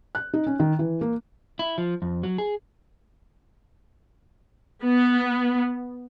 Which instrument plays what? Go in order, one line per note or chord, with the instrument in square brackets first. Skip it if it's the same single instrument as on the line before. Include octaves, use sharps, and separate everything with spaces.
[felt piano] F#6
D#4
C#4
D#3
E3
A#3
[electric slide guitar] E4
F3
F2
F#3
G#4
[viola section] B3